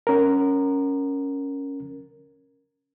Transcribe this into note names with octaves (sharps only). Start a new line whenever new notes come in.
C#4 A#4